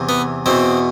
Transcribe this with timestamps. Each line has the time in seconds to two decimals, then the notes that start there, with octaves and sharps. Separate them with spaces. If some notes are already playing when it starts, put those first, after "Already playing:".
Already playing: E2 C3 E3
0.09 B3
0.46 E2 B2 C4